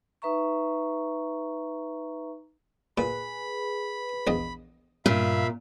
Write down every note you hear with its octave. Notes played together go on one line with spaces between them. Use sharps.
D#4 B4 E5 A#5 C#6
A#2 G#4 B4 B5
A#1 E2 D#5
G2 A#2 E5 F5 B5